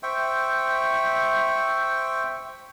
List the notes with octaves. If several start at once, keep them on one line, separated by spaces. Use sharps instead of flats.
C5 E5 G5 C#6